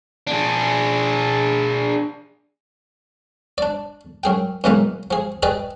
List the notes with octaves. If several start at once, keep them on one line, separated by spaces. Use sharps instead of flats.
D4 G#4
D4 D5
F#2 G#4 G5
F#2 B2 E3 G#3 A#3 D#4
F3 G#4
G4 G#4 B4 D5 D#5